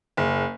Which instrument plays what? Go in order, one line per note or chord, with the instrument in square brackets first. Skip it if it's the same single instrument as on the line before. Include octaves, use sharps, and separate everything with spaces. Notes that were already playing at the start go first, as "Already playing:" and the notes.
[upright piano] F#1